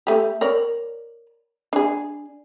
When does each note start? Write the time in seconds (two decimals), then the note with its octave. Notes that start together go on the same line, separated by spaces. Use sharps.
0.07 A3 G4
0.41 A#4 C#5 D5
1.73 D4 G#4